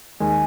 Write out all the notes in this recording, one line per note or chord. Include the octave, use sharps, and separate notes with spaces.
D#2 D#3 G#3 G#5